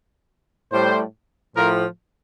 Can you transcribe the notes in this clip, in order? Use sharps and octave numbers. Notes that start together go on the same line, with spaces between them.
A2 G3 C5
A2 F3 A#4